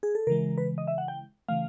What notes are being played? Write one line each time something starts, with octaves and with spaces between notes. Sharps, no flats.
G#4
A4
C#3 E3 G#3 A#4
B4
D#5
E5
F#5
G5
C#3 E3 A3 F5